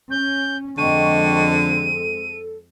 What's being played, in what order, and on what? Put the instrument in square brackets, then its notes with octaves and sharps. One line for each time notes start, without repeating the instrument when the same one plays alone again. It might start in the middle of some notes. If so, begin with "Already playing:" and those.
[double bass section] C#4 [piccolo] G6
[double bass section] F2 G#3 C4 [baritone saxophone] D3 [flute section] D#5 G5 C#6 [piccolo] D#7
[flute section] A4